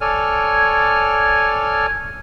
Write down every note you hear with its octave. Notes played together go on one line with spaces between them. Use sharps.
A4 C#5 D5 G#5 F6